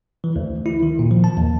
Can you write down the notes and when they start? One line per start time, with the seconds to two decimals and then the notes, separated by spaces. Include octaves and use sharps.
0.24 E3
0.36 D2
0.66 E4
0.83 D#3
0.99 A#2
1.11 F3
1.24 A5
1.37 D#2